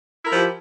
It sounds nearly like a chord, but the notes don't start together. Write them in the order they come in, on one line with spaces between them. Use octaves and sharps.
E4 A#4 F3 G4